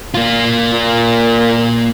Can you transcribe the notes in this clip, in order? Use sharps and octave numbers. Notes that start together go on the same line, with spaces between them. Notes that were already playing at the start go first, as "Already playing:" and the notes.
A#3 F4
A#2